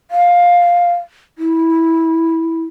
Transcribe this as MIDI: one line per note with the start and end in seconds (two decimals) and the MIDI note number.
0.11 0.93 77
1.38 2.62 64